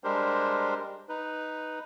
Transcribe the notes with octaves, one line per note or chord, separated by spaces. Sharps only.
G3 G#3 D4 G4 A#4 C5
D#4 B4